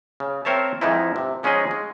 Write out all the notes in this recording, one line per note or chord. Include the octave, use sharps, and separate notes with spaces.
C#3
C4 A#4 C5 C#5 E5 A5
F2 G#2 E3 F3 D#4 E4
C3
F3 G#3 C#4 D#4 G#4 D#5
G#3